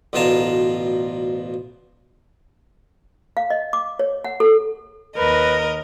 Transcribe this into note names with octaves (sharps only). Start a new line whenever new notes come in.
A1 D2 B2 F4 A5 A#5
F5
D#5
D6
C#5
F#5
A4
D#2 A#4 B4 D#5